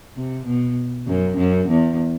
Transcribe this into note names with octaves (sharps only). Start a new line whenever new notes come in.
C3
B2
F#2
F#2
E2